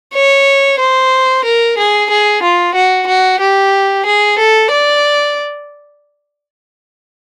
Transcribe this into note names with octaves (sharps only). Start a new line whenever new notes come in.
C#5
C5
A#4
G#4
G#4
F4
F#4
F#4
G4
G#4
A4
D5